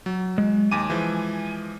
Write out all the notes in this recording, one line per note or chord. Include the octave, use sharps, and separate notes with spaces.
F#3
G#3
D#2 G#5 D6 D#7
E3 F3 G#3